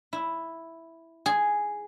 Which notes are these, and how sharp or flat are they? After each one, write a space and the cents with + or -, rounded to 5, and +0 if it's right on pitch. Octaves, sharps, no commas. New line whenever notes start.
E4 +0
G#4 +0